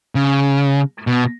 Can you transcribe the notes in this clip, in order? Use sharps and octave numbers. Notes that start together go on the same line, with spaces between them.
C#3
B2